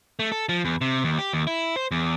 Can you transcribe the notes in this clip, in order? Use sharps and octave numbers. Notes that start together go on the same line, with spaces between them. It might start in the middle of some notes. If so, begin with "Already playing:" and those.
A3
A4
F3
E2
C3
D#2
G4
D#2
E4
C5
E2